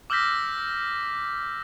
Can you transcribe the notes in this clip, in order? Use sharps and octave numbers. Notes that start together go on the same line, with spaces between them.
D6 E6 F6 G6 A#6 B6